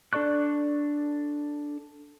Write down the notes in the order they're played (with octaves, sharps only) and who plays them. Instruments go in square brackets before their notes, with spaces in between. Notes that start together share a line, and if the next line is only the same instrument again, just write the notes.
[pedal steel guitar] D4 A4 D5 C#6 F#6